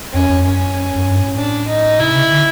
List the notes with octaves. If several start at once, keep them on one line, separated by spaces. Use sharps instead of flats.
F2 C#4
F2
F#2 C#4
F#2
G2
A2
D4
D#4
C3 E4
C#3
D3